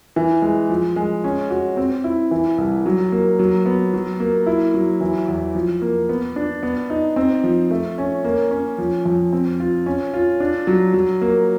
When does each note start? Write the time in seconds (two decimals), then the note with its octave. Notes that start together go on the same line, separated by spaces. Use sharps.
0.16 E3
0.42 G#3
0.69 F3
0.96 G#3
1.24 C#4
1.50 F#4
1.77 C4
2.04 E4
2.31 E3
2.58 C2
2.86 F#3
3.12 A#3
3.39 F#3
3.66 B3
3.94 F#3
4.20 A#3
4.46 E4
4.74 F#3
5.01 E3
5.28 E2
5.55 F3
5.82 A#3
6.09 B3
6.36 D4
6.63 B3
6.90 D#4
7.16 C4
7.44 F3
7.71 A3
7.98 C#4
8.24 A#3
8.51 C#4
8.78 F3
9.05 F2
9.33 C4
9.60 F4
9.86 C#4
10.13 F4
10.40 D4
10.67 F#3
10.94 F#3
11.22 A#3